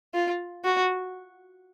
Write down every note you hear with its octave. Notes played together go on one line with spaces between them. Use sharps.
F4
F#4